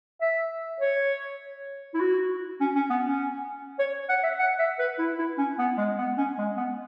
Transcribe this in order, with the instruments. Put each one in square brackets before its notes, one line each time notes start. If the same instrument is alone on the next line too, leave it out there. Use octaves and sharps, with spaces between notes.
[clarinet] E5
C#5
E4
F#4
C#4
C#4
B3
C#4
C#5
F#5
E5
F#5
E5
B4
E4
E4
C#4
B3
G#3
B3
C#4
G#3
B3